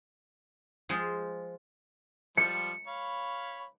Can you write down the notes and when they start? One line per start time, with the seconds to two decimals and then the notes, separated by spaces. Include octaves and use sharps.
0.89 F3 G#3 F4 G#4 C5
2.37 F3 G3 C#7
2.87 C#5 F5 B5